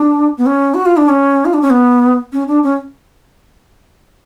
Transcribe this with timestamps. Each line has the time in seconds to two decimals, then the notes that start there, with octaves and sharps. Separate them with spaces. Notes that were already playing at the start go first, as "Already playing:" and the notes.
Already playing: D4
0.38 B3
0.46 C#4
0.74 F#4
0.86 F4
0.97 D4
1.09 C#4
1.45 F4
1.54 D4
1.62 C#4
1.70 B3
2.33 C#4
2.48 D4
2.63 C#4